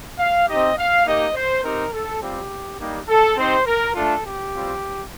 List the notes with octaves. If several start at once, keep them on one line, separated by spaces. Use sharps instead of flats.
F5
C4 D#4 G4 D#5
F5
A#3 D#4 G4 D#5
C5
C4 D#4 G4 A#4
A4
G3 C4 F4 G4
G3 A#3 D#4 G4
A4
C4 D#4 G4 C5
A#4
A3 D4 F4 A4
G4
G3 C4 F4